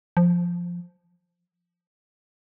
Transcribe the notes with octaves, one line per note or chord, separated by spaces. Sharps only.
F3